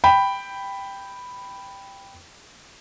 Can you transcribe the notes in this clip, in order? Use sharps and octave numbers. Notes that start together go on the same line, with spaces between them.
G5 B5